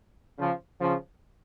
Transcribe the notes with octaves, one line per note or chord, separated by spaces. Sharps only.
C#3 F3
C#3 F3